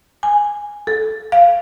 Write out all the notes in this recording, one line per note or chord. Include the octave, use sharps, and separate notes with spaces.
G#5
A4
F5